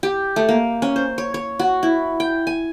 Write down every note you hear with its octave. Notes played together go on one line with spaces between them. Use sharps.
G4
A3
A#3
C#4
C5
C#5
C#5
F#4
E4
G5
G#5